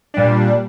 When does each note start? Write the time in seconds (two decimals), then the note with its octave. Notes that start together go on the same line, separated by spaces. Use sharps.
0.14 A#2 G3 D4